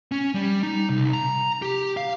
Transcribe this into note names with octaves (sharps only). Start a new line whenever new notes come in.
C#4
G3
D#4
C2
A#5
G4
F5